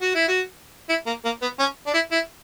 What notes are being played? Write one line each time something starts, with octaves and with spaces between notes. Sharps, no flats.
F#4
E4
F#4
E4
A#3
A#3
B3
C#4
D4
E4
E4